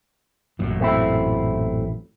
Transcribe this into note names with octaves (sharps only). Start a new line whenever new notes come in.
A1 F#2 A#2
A3 C4 E4